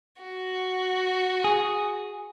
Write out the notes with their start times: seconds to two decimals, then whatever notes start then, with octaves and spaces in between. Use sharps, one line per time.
0.22 F#4
1.44 G#4